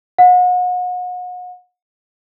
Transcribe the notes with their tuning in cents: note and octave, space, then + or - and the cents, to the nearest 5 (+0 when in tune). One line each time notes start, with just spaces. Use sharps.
F#5 -35